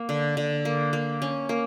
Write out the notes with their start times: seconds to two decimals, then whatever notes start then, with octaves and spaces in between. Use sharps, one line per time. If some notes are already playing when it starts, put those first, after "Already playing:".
Already playing: A#3
0.09 D3
0.37 D3
0.65 A#3
0.93 A#3
1.22 C#4
1.49 A#3